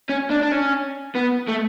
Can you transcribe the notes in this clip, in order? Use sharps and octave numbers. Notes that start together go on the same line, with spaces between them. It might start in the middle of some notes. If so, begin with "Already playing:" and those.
C#4
D4
D4
C#4
B3
A3